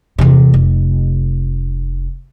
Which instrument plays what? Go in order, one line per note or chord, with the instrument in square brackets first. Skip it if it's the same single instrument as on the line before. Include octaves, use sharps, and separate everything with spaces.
[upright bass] E2 C3
F1